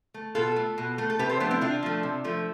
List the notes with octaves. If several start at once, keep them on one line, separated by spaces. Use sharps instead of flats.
A3
B2 F4 A4
A3
B2
A3
A4
C3 G4 B4
A4 C5
F3 A3 B3 D4
C4 E4
C3 D4 F4
F3 A3
C3
F3 A3